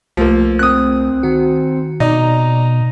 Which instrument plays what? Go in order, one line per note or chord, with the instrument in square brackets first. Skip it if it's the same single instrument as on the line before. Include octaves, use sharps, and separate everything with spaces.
[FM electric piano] C2 A3 [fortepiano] F3 A#3
[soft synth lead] C4 [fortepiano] D#6 F#6
[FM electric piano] D#3 F#4
[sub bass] B2 [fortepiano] D#4 [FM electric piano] D5 [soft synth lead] A#5